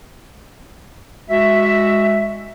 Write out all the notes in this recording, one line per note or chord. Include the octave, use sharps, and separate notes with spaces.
G#3 F#4 E5